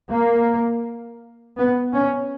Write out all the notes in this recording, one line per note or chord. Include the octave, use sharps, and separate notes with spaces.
A#3
B3
C#4